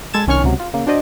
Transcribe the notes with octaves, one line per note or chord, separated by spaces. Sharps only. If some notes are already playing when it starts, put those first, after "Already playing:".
G#3 A4 G#6 A6 E7
C2 D#3 C#4 C#5 C#6 F6
C#2 C3 F#3
F4
C#3 A#3
D4 F#4 C5 D5 D#5